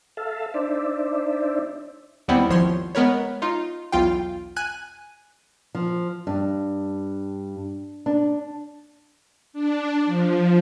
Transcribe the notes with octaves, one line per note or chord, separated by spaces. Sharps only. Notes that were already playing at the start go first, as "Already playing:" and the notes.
A4 E5 F5 A5
D4 D#4 C5 D5 E5
D#2 G3 B3 C4 E4
G#1 F3 C#5 C6
G#3 B3 A#4 B4 C#5
D#4 F4
B1 E2 F4 F5 G5
G#5 F#6 D#7
F3
G2
D4
D4
F3